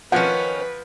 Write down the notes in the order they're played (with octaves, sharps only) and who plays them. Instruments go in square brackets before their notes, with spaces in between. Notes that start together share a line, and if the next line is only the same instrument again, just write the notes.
[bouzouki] D#3 C#4 [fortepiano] F3 [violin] B4 [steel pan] F#5